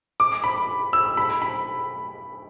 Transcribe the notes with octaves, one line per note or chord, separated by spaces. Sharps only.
D6
B5
E6
B5
B5